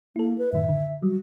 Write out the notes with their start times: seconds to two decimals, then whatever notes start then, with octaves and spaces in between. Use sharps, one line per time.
0.16 A#3 E4 A4
0.38 B4
0.53 F#2 A2 D#3 E5
0.69 D3
1.02 F#3 G3 F#4